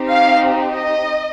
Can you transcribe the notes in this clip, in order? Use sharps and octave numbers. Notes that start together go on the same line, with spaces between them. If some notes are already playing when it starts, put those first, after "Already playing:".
Already playing: C4 D#4 G4
F5
D#5